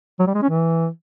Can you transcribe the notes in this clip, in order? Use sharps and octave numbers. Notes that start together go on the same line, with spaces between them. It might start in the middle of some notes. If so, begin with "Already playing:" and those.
F#3
G3
G#3
C#4
E3